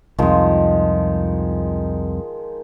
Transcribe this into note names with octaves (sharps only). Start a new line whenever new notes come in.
C2 F2 D#3 F3 G#3